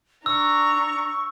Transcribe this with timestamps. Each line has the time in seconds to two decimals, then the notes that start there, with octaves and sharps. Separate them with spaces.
0.26 D4 A#5 C#6 E6